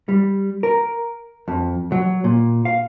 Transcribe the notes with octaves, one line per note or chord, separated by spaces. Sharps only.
G3
A#4
F2
F#3
A#2
F5